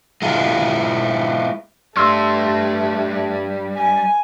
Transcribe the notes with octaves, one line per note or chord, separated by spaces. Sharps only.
G#3 E4 F4
G3 A3 D4 C6 E6
G#5